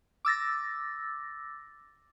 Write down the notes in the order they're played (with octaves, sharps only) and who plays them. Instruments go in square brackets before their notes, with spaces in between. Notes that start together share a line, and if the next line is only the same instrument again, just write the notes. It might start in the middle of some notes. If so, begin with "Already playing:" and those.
[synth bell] D6 E6 A6 A#6